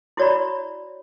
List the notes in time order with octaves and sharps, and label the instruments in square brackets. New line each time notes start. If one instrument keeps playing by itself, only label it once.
[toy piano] E4 F#4 C#5 D5 B5